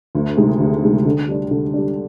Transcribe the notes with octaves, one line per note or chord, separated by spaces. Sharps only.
D2
C3 D#3 G#3
D2
C3 D#3 G#3
D3
G3 D4
D3
G3 D4